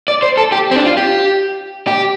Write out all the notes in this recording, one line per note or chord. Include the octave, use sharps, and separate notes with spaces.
D5
C5
A4
G4
C4
D4
F4
G4
G4